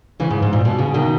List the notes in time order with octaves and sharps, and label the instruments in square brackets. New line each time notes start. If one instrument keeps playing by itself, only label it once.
[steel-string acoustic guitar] C#3 E3
G#2
G#2
A#2
B2
C#3
B2 D#3